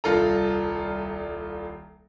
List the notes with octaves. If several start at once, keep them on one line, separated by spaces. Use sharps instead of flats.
D#1 C2 F4 A4 A#5